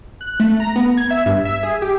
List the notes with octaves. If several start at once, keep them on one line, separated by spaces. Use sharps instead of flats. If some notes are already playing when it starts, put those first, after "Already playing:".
F#6
A3
A#5
B3
G#6
E5
G2
E5
G#4
G4